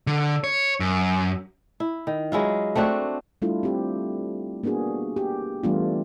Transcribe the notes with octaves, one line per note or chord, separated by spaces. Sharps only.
D3
C#5
F#2
E4
D#3
F#3 G#3 E4 F4
A3 C4 D4 F#4
G3 A3 D4 E4 F4 A4
C4 G4 D5
A#3 B3 D4 F#4 G#4
G4
E3 G3 A3 B3 D4 F4